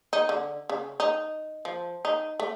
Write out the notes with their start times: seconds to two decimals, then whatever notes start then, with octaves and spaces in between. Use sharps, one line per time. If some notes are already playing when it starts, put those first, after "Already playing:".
0.13 D#4
0.29 D3
0.70 C#3
1.00 D#4
1.65 F3
2.05 D#4
2.40 A3